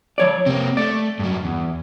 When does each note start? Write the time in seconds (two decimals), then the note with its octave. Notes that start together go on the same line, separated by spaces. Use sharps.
0.18 F3 C#5 D5
0.46 C3 A#3 C4
0.77 A3 D5
1.19 G2 F#3
1.45 E2